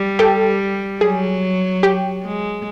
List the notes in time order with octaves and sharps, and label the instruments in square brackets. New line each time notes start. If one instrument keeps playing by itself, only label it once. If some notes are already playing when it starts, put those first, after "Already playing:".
Already playing: [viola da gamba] G3
[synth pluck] G4 A4
[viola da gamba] F#3 [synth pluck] G#4
[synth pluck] G4
[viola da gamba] G#3